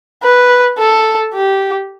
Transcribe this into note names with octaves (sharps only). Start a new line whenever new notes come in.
B4
A4
G4